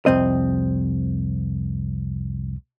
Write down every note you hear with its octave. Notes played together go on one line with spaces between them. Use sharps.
C2 F2 C4 D#5